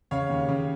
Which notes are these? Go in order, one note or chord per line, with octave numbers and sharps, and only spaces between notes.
C#3 C#5 F5
D#2
C#3